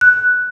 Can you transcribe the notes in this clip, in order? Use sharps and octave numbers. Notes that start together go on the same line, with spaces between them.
F#6